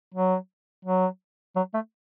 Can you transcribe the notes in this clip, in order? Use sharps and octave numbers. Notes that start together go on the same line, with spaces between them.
F#3
F#3
F#3
A3